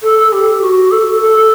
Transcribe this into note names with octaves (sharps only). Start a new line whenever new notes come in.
A4
G4
F#4
A4
A4